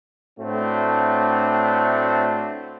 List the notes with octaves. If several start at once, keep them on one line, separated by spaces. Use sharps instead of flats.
A2 A3 C4 D4 F#4